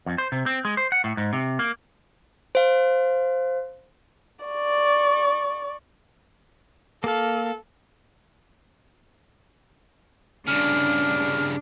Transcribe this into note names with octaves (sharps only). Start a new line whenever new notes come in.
F2
C5
C3
C4
G#3
C5
F#5
A2
G#2
C3
A#3
C5 F5
D5 C#6
A#3 A4 F5
G2 C#3 D4 F6